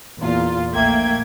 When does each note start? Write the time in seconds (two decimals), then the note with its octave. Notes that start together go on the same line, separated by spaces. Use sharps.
0.18 E2 A#2 F4
0.74 A#1 A3 A#3 E5 G5 G#6